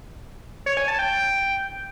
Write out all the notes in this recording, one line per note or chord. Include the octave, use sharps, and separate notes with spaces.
C#5
G#5
A5
G5